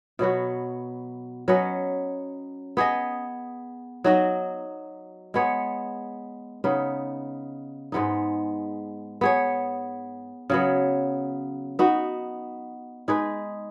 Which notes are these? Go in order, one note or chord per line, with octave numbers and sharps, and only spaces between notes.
B2 F#3 B3 F#4
F#3 C#4 B4 D#5
B3 G#4 D#5
F#3 D#4 F#4 D#5
G#3 B3 G#4 C#5
C#3 B3 D#4
G#2 G#3 B3 D#4
B3 G#4 C#5
C#3 F#3 B3
B3 D#4 F#4
G#3 D#4 G#4 B4